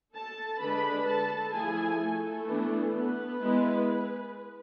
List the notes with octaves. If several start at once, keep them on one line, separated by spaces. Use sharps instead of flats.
A4 A5
D3 G#3 D4 B4 B5
A4 A5
F3 A3 E4 G#4 G#5
A3 A4
E3 B3 D4
B3 B4
G#3 B3 E4